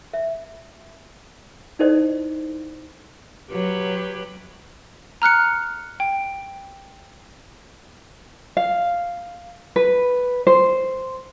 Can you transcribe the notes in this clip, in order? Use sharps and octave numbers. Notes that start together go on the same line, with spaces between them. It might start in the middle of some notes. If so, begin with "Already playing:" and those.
E5
D#4 E4 A4 C5 D5 D#5
F#3 G4 B4
A#5 F6 F#6 C#7
G5
F5
B4
C5